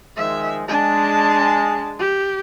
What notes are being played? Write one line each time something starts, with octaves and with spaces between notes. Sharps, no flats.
D#3 F3 G#3 E5
G#3 D4 A5
G4